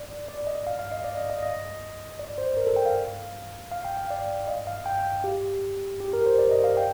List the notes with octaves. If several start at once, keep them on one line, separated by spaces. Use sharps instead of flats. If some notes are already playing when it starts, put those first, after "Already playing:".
Already playing: D5
D5
D#5
F5
F5
D#5
D5
D#5
D#5
D#5
D5
C5
A#4
A4
G5
F5
F5
G5
F5
D5
D#5
F5
G5
G5
G4
G4
A#4
C5
D5
D#5
F5
G5